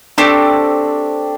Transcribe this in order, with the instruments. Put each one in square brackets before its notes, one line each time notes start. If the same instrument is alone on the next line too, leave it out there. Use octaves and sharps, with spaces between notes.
[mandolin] A3 C4 G4 [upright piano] D4